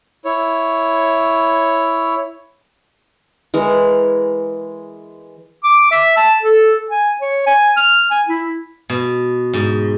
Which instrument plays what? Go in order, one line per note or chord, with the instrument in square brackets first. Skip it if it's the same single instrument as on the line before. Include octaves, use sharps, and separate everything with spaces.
[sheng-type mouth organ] E4 C#5
[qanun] E3 G#3 A#4
[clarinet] D6
E5
A5
A4
G#5
C#5
G#5
F6
G#5
E4
[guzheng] B2
G#2